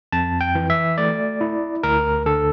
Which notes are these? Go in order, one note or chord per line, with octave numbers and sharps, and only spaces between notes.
F2 A5
G5
E3
E5
A3 D5
E4
D2 A#4
D3 A4